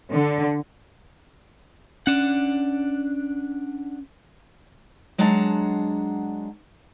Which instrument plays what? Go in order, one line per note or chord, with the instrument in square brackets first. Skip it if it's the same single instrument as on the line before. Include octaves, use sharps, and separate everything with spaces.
[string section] D3
[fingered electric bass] C#4 [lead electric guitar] D4 F#5
[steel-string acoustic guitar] F#3 G#3 D4 F#5 A5 A#5